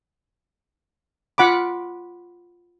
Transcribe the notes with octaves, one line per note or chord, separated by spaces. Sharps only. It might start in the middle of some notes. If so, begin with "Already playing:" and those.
F4 F#5 B5 D6